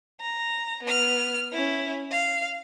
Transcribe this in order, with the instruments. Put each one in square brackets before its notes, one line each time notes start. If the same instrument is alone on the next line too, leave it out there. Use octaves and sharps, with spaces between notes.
[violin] A#5
B3 F6
C#4 E4
F5